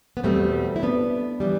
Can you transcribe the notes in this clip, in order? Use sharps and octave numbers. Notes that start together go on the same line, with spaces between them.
B3
E2 B2 G3 A3 C4
E4
B3 D4
E3 G3